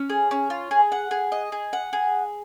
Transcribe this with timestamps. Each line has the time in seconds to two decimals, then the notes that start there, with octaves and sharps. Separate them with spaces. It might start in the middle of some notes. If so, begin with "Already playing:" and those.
Already playing: C#4
0.10 G#4
0.31 C#4
0.50 F4
0.71 G#4
0.92 F#5
1.11 G#4
1.32 D#5
1.52 G#4
1.73 F#5
1.93 G#4